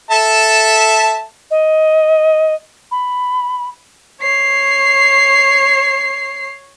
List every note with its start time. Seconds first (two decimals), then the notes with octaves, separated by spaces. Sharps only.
0.11 A4 E5 A5
1.51 D#5
2.91 B5
4.21 C#5 C7